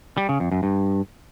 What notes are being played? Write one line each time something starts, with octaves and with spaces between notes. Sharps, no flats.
G3
C#3
F2
F#2
G2